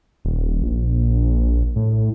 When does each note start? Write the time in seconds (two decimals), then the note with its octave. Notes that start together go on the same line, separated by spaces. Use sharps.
0.25 D#1
0.62 A#1
1.76 A2